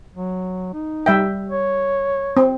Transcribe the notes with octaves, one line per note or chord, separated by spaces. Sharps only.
F#3
D#4
G3 E5 G5
C#5
C4